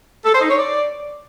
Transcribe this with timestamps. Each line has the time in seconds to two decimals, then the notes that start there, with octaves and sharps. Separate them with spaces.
0.24 A4
0.33 C5
0.41 D#4
0.50 C#5
0.58 D5